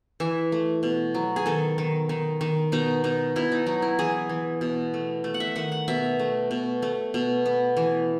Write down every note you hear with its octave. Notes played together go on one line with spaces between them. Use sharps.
E3 E5
A3
B2
F#3
G#4
D#3 A4
D#3
D#3
D#3
B2 D#4
B2 D#4
B2 E4
D#4
F#3 D#4
E4
E3 G#4
E3
B2
A3
A3
F#5
E5
D#3 F#5
F#5
B2 E5
A3
B2
A3
B2
B3
E3